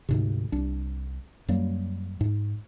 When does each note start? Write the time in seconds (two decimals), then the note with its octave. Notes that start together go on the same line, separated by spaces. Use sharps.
0.09 D2 G#2 C3
0.52 C2 D4
1.48 F#2 F#3 G3 A#3
2.21 G#2